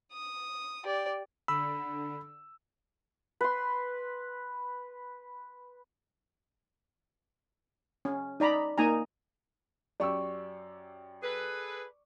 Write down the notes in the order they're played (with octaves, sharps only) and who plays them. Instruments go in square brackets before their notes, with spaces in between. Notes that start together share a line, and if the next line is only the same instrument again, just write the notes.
[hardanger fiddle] D#6
G4 D5
[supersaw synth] D3 [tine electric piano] B5 [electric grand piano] E6
[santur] B4 C6
[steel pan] C#4
D#4 D5 A#5 B5
A#3 D#4 G#5 A#5
[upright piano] F#2 G4 E6 [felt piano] D5 C#6
[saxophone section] G#4 A4 B4